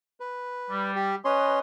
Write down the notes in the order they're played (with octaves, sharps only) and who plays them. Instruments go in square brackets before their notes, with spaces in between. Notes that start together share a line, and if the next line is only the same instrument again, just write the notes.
[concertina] B4
[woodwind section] G3
[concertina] G4
[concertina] C#4 C#5 C6 [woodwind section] B4 D#5